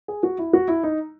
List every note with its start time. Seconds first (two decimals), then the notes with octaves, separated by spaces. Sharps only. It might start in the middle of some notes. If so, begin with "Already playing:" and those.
0.08 G#4
0.23 F#4
0.38 E4
0.53 F#4
0.68 E4
0.83 D#4